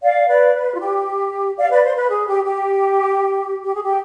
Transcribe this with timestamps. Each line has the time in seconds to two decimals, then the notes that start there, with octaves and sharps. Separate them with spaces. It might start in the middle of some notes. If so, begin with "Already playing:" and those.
0.02 D5 F5
0.28 B4 D5
0.55 B4
0.75 F4
0.80 G4
1.58 D5 F5
1.71 B4 D5
1.84 C5
1.96 B4
2.10 G#4
2.27 G4
2.44 G4
3.64 G4
3.74 G#4
3.82 G4